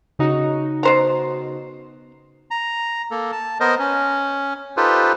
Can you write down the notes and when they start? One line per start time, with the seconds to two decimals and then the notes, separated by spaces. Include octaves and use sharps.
0.19 C#3 D#4 F#4
0.83 B2 C5 A#5
2.51 A#5
3.11 A#3 A4
3.32 A5
3.60 B3 A#4 C5 D#5
3.79 C#4
4.77 D#4 F4 G4 A4 B4 C5